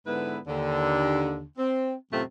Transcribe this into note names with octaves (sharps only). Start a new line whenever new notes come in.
G#2 D3 B3 E4 B4
D#2 D3
C4
F#2 A2 C3 A3 C4 F4